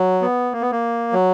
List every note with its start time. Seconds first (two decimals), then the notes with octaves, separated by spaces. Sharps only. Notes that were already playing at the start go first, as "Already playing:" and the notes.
Already playing: F#3
0.21 B3
0.53 A#3
0.61 B3
0.72 A#3
1.13 F#3